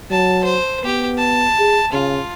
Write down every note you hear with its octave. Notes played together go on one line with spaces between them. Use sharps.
F#3 A5
C5
B3 G4
A5
G#4
C#3 F4